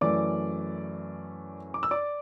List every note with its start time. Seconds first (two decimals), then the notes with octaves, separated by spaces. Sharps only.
0.01 F#2 E3 A3 D5 D6
1.74 D6
1.83 E6
1.91 D5 D6